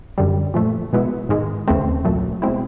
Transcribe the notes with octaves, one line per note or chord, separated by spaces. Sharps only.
F#2 D3 G3
A#2 F3 A3
B2 G#3 B3 E4
G#2 D#3 G#3
D#2 C#3 E3 A3 C4
C2 A#2 F#3 A3
B2 G#3 C4 E4